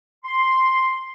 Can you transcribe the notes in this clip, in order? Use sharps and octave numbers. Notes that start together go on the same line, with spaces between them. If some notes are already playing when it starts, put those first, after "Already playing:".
C6